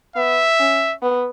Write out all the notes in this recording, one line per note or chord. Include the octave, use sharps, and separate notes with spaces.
B3 E5
C#4
B3